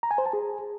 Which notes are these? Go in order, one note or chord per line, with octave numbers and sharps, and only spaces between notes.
A#5
G#5
C5
A5
G#4